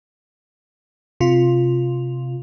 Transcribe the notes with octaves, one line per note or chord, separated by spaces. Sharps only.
C3 F4